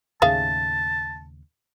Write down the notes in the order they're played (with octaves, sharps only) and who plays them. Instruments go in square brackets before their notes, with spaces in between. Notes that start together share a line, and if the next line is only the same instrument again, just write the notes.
[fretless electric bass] D#2 A2 C#3 [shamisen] G#4 E5 F5 [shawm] A5